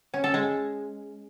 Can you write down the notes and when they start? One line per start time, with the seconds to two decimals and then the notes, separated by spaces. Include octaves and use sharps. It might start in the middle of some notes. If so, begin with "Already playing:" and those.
0.14 C#4
0.24 A4
0.34 G#3